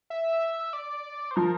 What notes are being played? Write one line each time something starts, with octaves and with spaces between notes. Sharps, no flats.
E5
D5
C5
F3 A#4